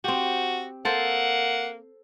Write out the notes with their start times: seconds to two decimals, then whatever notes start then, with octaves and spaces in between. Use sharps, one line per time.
0.04 C4 F#4 G4
0.85 A#3 A4 C5 F#5